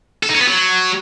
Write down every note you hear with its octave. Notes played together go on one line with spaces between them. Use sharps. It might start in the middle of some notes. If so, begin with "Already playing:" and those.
A4
D#4
C#4
B3
F#3